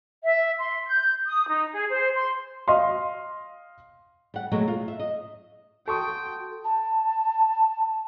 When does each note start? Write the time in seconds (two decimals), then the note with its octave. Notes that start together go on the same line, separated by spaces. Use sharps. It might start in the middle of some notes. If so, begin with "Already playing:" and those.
0.23 E5
0.58 C6
0.87 G6
1.25 D#6
1.48 D#4
1.73 G#4
1.89 C5
2.15 C6
2.68 D#5 F5 C6
4.34 G3 F#5
4.52 B2 F#3 G#3 A3 E4
4.68 F4
4.88 E5
4.99 D#5
5.88 F#4 A4 G5 A5 C6 C#6 D#6
6.65 A5